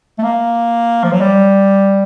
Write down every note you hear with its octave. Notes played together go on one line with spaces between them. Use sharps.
A3
A#3
F3
F#3
G3